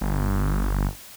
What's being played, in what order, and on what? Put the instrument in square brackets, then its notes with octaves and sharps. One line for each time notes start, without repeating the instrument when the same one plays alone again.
[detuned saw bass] G1